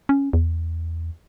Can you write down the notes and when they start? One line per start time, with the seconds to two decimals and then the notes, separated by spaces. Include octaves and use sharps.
0.09 C#4
0.33 E2